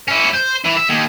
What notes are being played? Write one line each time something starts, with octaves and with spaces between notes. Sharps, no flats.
C#4 E4
C5
E3 E4
E5
D#2